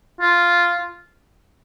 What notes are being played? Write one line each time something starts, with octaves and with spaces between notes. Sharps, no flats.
F4